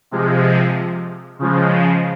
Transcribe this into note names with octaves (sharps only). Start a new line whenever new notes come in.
C3 F3 G#3
C#3 F3 G#3